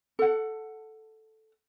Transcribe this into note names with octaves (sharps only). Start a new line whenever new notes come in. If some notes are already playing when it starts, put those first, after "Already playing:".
A4 F#5